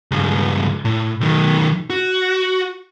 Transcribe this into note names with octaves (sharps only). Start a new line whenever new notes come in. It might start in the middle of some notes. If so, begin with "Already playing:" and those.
C#2 G2
A2
B1 D#3
F#4